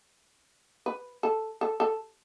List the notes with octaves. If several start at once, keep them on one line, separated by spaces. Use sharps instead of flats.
B4
A4
A4
A4